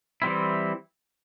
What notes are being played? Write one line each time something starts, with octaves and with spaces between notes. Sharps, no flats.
E3 G3 C4 E4